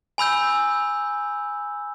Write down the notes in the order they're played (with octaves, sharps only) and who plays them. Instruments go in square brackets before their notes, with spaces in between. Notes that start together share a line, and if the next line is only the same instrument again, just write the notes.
[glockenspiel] G#5 B5 E6 G6